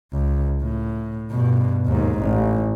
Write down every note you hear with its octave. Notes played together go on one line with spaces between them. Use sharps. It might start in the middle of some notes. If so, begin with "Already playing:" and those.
C#2
A2
G2 B2
D#2 G#2
A1